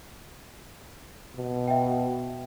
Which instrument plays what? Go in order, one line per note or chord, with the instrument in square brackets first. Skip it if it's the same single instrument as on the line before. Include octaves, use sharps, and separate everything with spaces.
[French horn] B2
[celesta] E5 G5